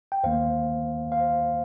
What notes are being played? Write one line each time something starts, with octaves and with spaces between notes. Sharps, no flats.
G5
D#2 D#3 A#3 C5 F5
C5 F5